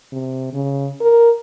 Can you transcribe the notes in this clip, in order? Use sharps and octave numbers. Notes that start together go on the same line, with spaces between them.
C3
C#3
A#4